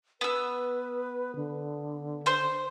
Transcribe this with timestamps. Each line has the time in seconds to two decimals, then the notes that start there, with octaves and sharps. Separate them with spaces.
0.21 B3 B4 E6
1.36 D3
2.26 C5 C6 G6